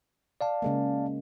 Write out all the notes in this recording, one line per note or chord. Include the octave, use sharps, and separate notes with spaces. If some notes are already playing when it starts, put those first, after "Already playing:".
D5 F5 A5
C#3 G#3 A#3